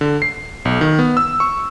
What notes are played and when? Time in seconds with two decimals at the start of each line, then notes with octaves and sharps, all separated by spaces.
0.01 D3
0.22 C7
0.65 B1
0.81 D#3
0.99 B3
1.17 E6
1.40 C#6